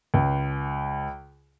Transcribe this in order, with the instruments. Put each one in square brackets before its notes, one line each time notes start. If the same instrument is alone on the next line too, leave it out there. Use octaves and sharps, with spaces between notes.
[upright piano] C#2